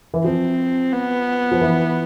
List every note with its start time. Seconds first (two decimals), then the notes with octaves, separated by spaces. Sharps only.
0.14 E3
0.24 F3 C4
0.93 B3
1.51 F3
1.61 E3